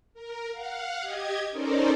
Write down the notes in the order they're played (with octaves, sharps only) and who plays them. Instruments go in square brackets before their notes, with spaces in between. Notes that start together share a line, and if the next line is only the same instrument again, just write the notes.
[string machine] A#4
F5 F#5
G4 D#5 G#6
C#4 D#4 A4 A#4 C5 D5